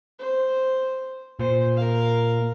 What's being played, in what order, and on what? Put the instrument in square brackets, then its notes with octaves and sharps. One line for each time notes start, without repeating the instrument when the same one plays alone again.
[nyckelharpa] C5
[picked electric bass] A#2 [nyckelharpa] C5
[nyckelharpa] A#4 F5